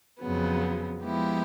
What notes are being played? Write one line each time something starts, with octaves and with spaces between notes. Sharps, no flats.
F2 C#3 F#3 B3
F3 G#3 B3 E4 G4